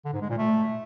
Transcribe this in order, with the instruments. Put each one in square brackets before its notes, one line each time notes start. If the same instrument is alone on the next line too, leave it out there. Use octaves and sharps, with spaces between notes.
[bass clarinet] D3
G#2
G#3
A#2
A3